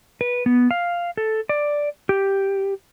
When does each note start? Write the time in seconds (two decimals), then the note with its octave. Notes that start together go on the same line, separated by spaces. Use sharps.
0.21 B4
0.46 B3
0.71 F5
1.17 A4
1.49 D5
2.09 G4